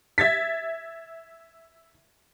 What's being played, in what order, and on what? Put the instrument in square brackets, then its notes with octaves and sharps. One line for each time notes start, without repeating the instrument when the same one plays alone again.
[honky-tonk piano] E5 G#6 A6 B6